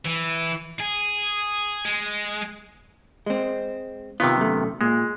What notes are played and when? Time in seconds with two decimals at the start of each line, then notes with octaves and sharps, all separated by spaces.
0.05 E3
0.80 G#4
1.85 G#3
3.26 G#3 C4
4.20 C3 D#3 B3 F4
4.37 F#2 A3
4.81 A#2 G#3